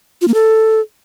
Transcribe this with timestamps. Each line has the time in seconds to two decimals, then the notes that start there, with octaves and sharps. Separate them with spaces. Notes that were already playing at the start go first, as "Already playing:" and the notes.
0.22 F4
0.28 A#3
0.34 A4